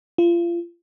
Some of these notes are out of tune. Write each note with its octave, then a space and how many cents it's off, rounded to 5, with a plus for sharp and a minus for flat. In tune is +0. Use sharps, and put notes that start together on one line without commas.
F4 -30